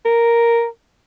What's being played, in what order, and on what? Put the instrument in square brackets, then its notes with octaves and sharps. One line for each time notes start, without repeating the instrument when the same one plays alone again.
[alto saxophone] A#4